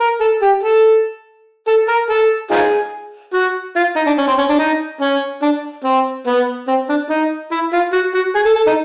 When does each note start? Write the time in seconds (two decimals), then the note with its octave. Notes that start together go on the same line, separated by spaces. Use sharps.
0.01 A#4
0.21 A4
0.42 G4
0.63 A4
1.68 A4
1.89 A#4
2.10 A4
2.51 D#4 F4 G#4
3.34 F#4
3.76 F4
3.96 D#4
4.07 D4
4.18 C#4
4.28 C4
4.39 C#4
4.50 D4
4.59 D#4
5.01 C#4
5.42 D4
5.85 C4
6.27 B3
6.68 C4
6.89 D4
7.10 D#4
7.52 E4
7.73 F4
7.93 F#4
8.15 F#4
8.35 G#4
8.45 A4
8.56 A4
8.67 D#4